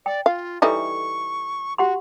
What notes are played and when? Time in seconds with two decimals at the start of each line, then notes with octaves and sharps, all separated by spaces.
0.06 D5 G5
0.26 F4 F5
0.62 E3 G3 D#4 A4 E5 C#6
1.78 F#4 G4 F#5 C6